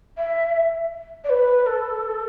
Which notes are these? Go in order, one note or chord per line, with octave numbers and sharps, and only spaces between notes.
E5
D5
B4
A4